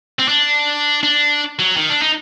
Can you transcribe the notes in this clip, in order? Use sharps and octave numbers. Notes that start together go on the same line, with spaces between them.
C4
D4
D4
F#3
D#3
D4
D#4